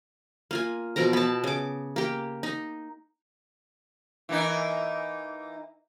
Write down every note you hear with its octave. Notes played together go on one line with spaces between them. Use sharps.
A#3 F4 G#5
B2 F3 A#4 A#5
B3 A5
C#3 D6
A#3 G4
D#4
E3 A#3 D#4